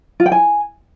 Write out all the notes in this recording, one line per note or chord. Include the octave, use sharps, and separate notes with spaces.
F4
G5
G#5